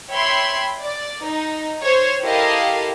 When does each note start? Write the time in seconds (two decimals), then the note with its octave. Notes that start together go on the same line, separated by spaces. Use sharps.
0.11 C#5 E5 G5 B5 C6
0.83 D5
1.26 D#4
1.82 C5 C#5
2.22 E4 G4 A4 A#4 D#5 F5